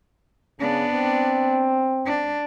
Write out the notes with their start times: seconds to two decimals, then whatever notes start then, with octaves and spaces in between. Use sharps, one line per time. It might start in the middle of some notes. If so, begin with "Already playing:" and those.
0.60 C#3 B3 D4
0.92 C4
2.06 D4